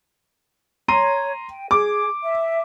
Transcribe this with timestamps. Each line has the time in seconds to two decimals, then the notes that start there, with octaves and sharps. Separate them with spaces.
0.88 C#5 A#5 C6 D#7
1.51 G5
1.71 G#4 D6
2.23 E5